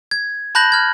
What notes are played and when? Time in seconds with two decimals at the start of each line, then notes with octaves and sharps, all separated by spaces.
0.11 G#6
0.55 A5 B5 F#6 G6 A#6 F#7
0.72 F6 G#6